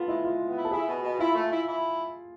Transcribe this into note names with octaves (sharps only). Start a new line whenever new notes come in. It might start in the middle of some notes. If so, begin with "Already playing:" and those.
Already playing: B3 F4 A4
G#3 E4
G#3 F4
B3
E4
A4
E4 G#4
B2
B2
E4 F4
A3
E4
E4